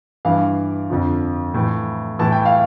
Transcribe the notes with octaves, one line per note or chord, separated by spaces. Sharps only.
G2 E3 F5
F2 D3 F3
A2 E3
A2 E3 A5
G5
F5